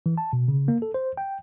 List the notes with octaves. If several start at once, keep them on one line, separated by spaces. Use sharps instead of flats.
E3
A5
B2
C#3
A#3
A4
C5
G5